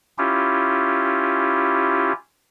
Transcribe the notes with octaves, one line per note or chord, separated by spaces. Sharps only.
C#4 E4 F4 G4